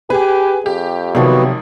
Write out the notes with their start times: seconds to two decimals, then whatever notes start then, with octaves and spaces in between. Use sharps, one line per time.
0.10 G4 G#4 B4 G#5
0.66 F2 G4
1.15 G#1 C3 D#3 F3 F#3 B3 F#4 G4